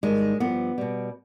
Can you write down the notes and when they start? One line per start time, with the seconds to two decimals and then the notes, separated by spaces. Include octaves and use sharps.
0.03 G#2 D#3 G3 G#3
0.40 G2 F3 B3
0.78 B2 G3